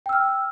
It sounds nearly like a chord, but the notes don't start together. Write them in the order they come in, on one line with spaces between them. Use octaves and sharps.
G5 E6 F6